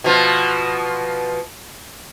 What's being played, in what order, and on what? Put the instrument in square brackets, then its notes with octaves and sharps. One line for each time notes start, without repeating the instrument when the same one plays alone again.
[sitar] B2 F3